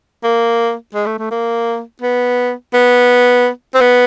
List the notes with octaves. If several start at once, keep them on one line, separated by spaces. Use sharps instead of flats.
A#3
G#3
A3
A3
A#3
B3
B3
C4
B3